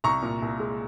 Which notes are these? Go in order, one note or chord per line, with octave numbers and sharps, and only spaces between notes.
C2 A#5 C#6
A#2
C2
G#3